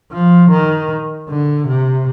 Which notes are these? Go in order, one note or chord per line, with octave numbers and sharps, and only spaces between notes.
F3
D#3
D3
C3